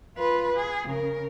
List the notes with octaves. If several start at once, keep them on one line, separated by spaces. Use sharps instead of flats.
F4 B4
G#4
C#3 A#4